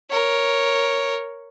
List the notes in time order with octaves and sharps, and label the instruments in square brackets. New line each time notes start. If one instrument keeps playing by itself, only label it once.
[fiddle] A#4 C#5